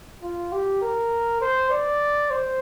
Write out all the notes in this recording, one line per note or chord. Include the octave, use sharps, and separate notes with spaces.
F4
G4
A#4
C5
D5
C5